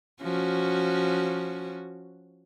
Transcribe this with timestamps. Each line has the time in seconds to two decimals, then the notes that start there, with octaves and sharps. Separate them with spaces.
0.22 F3 C#4 F#4